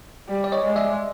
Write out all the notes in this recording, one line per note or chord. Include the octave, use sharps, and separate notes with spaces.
G3
D5
C#5 D#5
G#3
D5 E5